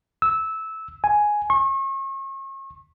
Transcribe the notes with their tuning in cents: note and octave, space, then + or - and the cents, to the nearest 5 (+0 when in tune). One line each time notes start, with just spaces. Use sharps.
E6 -15
G#5 +5
C#6 -40